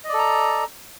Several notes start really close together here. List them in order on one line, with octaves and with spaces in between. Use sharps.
D#5 D5 A4 A#5